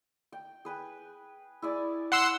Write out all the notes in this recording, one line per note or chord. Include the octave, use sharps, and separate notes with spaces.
G5
G#4 B4 G5
E4 G#4 D5
F#5 C6 E6